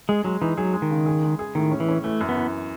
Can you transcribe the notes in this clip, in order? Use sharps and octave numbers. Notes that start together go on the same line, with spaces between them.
G#3 G#4
F#3 G#3
E3 D#4
F#3 G#4
G#3
D#3
C#3
G#4
G#3
G#4
A2 D#3
C#4
E3
C#4
E3 A3
F#2
B3
E3